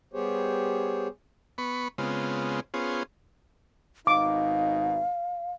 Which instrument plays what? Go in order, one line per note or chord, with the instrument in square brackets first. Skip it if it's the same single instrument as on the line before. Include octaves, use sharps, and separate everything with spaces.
[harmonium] G3 B3 G4 G#4 C5 C#5
[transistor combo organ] B3 B5 C#6
C#3 G#3 B3 C4 F4
B3 C#4 F4 G#4 C5
[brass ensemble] G#1 B2 D#4 [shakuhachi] F5 [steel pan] D6